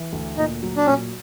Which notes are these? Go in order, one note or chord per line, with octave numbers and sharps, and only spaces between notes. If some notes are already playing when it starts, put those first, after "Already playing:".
Already playing: E3
D2
A#2 D#4
F#3
D4
A#2 C#4